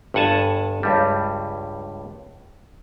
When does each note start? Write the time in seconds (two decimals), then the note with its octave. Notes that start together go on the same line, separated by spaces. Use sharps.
0.14 G1 G2 F#5 G#5 A5
0.83 C#2 G2 G3